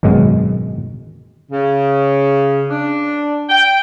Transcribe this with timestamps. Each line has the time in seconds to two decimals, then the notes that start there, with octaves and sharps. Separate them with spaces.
0.03 G#1 F#2 B2 G#3
1.51 C#3
2.70 D4
3.50 G5